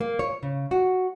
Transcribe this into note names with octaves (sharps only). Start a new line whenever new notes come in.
A#3
C#5
C#3
F#4